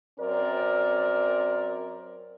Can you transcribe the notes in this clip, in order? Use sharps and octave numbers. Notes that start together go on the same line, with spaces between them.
F#2 C4 A#4 D5